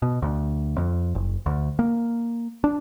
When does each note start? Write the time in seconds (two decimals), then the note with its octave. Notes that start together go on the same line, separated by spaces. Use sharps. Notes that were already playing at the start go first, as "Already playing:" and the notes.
0.02 B2
0.22 D2
0.78 F2
1.15 F#1
1.46 D2
1.79 A#3
2.64 D4